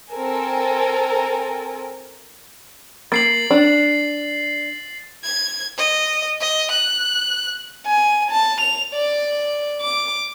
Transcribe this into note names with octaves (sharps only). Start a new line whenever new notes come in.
C4 A4 A#4 G#5
A#3 A6 C7 F#7
D4
G#6
D#5
D#5
F#6
G#5
A5
F7
D5
D6